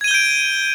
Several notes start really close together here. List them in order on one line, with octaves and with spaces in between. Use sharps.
G#6 D#7 G7 G6 D7